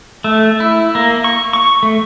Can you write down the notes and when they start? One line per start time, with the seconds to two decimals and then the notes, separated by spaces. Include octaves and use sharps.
0.24 A3
0.60 E4
0.95 A#3
1.24 C#6
1.53 C#6
1.83 A3